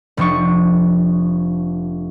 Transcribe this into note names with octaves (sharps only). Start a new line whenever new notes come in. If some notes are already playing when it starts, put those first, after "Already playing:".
F1 F3 D4 C#6